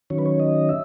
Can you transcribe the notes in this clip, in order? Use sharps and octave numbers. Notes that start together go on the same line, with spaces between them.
D#3 F#3 C#4 C#5
B4
C#5
D#5
E5